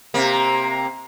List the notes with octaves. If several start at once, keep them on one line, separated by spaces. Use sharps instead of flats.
C3 A#3